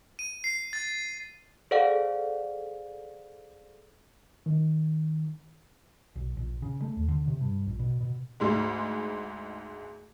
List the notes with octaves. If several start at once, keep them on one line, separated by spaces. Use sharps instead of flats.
D#7
C7
A6
G#4 A4 C5 D5 F5 F#5
D#3
B1
A#1
C#3
A3
D#2
D3
C3
G2
A#1
B2
B2
D2 G#2 G#3